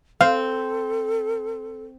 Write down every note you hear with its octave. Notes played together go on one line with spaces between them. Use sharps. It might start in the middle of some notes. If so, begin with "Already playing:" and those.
C4 A4 F5